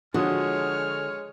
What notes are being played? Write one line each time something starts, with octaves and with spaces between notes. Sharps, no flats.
D3 F3 G#3 F#4 C#5 D#6 F6